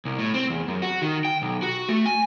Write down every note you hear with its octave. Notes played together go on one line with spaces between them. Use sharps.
C2
A2
C4
E2
F#2
F#4
D#3
G5
B1
F#4
A3
G#5